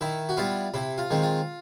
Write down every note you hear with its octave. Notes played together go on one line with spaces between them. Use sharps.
D#3 E4
F#4
G3 B3 E4 F4
C3 E4
F4
D#3 G#3 C4
F4